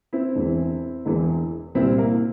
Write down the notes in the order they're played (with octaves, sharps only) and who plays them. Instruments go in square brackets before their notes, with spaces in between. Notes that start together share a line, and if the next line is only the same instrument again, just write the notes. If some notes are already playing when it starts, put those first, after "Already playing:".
[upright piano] C4 E4
E1 E2 E3
E1 E2 E3
C2 A#2 G3 C4 E4
A#3